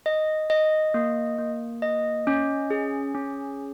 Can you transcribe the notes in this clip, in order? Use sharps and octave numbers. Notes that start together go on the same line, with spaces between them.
D#5
D#5
A#3
A#3
D#5
C#4
G#4
C#4